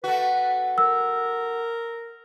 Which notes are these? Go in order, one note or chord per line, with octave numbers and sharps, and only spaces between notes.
A3 F#4 B4
A#4 E6